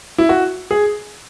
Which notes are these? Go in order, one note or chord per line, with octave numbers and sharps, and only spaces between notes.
E4
F#4
G#4